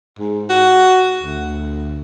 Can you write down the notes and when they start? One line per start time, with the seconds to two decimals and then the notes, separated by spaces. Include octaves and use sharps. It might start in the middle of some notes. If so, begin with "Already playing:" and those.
0.19 G#2
0.50 F#4
1.21 D2